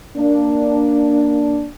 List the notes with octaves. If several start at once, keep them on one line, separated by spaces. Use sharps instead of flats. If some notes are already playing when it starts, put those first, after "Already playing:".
A#3 D4